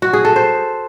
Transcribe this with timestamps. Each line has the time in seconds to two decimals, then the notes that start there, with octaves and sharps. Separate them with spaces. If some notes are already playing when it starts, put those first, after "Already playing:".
0.02 F#4
0.13 G#4
0.25 A4
0.36 C5